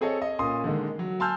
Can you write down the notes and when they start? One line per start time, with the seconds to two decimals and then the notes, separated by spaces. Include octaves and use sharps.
0.01 C4 G#4 A4 C#5 D#5
0.22 D#5
0.39 A#2 C#4 C6 D#6
0.64 D3 D#3 G#3
0.99 F#3
1.20 G#5 A5 C6 E6 F6 G6